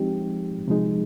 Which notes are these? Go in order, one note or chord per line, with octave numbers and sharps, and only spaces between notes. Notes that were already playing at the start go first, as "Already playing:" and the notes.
Already playing: F3 G#3 C4 D#4 G4
C3 F3 G#3 D#4 G#4